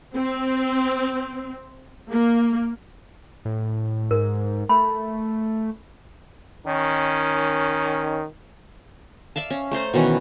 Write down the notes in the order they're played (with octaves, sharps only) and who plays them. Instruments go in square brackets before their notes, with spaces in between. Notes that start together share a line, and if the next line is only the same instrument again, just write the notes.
[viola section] C4
A#3
[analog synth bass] A2
[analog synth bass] G#2 [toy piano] A#4
[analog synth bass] A3 [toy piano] B5
[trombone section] D#3 C#4
[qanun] D5 E5 F5 A5
C#4
A3 A4 C5 A#5
B2 D#3 E3 C#4